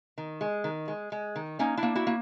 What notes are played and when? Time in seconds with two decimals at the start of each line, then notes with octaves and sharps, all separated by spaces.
0.18 D#3
0.41 G#3
0.64 D#3
0.88 G#3
1.12 G#3
1.36 D#3
1.59 A#3 C#4 D#4
1.77 D4 E4
1.83 A#3
1.95 E4 F#4
2.07 A#3